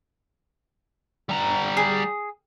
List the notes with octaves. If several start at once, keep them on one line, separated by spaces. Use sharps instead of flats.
G3 A#5
G#4